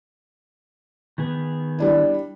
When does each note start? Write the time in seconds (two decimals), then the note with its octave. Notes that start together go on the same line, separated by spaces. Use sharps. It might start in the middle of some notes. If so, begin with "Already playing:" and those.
1.18 D#3 B3 G#4
1.79 G3 D4 E4